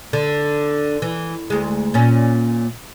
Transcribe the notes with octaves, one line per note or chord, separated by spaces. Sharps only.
D3
E3
D2 G#3
A#2 C#4